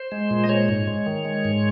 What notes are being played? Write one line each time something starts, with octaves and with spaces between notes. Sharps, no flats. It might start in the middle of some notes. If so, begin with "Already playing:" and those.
Already playing: C5
G#3
A#2
D#5
G#3 C#5
G#2
G#3
D#3
G#3
G#2